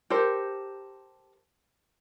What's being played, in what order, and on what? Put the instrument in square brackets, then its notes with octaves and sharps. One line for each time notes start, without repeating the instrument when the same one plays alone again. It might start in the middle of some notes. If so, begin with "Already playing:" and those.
[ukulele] G4 A4 A#4 C5